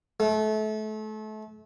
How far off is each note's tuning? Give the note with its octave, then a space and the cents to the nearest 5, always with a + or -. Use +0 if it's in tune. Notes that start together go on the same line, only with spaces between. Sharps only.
A3 -30